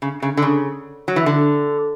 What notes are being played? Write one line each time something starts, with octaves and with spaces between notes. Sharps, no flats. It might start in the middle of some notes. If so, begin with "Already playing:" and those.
C#3
C#3
D3
C#3
F#3
E3
D3